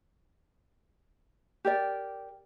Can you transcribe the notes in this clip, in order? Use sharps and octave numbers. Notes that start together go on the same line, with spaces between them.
G4 A#4 D5